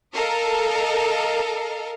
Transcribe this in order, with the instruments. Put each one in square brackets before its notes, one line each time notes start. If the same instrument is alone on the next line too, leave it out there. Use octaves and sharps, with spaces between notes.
[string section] A4 A#4 D#5 F5